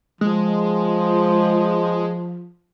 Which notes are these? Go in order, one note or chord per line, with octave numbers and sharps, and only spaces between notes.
F3 G#3